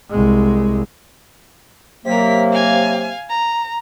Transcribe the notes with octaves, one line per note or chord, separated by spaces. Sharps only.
C2 G#3
C3 F#3 A#3 A#4 B6
F5 G#5
A#5